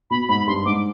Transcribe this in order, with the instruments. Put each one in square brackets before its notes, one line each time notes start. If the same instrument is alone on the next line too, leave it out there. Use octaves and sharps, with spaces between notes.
[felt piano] B2 [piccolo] B5
[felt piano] G#2 [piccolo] B5
[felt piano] G2 [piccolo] C6
[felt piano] G#2 [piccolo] D6